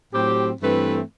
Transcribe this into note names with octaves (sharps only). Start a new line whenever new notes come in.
A2 F#3 C4 G4
G2 E3 A3 C4 B4